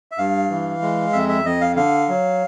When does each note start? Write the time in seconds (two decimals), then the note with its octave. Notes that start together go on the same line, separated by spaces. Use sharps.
0.11 E5
0.18 G2 F5
0.50 E3
0.82 G#3
1.13 F2 E5
1.29 E5
1.45 F2 D#5
1.61 F5
1.76 D3 F5
2.08 F#3